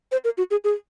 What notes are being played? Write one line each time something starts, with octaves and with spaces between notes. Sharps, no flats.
C5
A#4
F#4
G#4
G#4